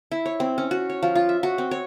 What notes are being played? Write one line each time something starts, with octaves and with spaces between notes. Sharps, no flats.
E4
C#5
C4
C#4
F#4
C#5
F3
F4
E5
F#4
C4
C#5